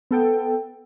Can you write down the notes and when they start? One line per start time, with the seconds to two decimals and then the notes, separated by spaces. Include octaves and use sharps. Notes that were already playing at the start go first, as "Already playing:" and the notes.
0.11 B3 A4 G5